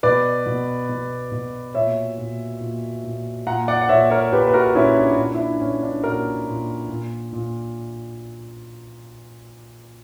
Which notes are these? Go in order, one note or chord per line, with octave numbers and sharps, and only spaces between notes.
B2 B4 D5
B2
B2
B2
A#2 C#5 E5
A#2
A#2
A#2
A#2 F#5 A#5
D5 F#5
F#5
A#2 C#5 E5
A#4 C#5
A#2 G4 B4
B4
F#4 A#4
A#2 C#4 E4
D4
A#2 D4
E4
D4
A#2 C#4
D4
A#2 F#4 A#4
A#2
A#2
A#2